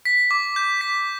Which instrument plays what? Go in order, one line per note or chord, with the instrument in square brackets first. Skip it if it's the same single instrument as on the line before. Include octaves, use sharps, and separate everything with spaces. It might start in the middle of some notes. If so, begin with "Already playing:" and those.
[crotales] B6
D6
G6
B6